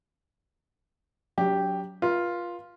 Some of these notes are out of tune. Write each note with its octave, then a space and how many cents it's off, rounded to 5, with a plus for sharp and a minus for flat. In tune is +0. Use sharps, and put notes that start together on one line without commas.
F#3 +0 D4 -45 G4 +0
F4 +0 B4 -40